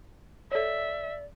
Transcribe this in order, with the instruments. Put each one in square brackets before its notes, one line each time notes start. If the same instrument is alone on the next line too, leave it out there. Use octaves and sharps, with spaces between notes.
[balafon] A4 C#5 [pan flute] D5 [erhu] E5